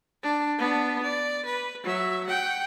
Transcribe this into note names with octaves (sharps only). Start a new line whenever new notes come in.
D4
B3 D4
D5
B4
F#3 E5
F#5 G5